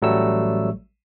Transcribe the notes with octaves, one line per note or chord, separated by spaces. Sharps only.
A1 F#3 G3 A3 E6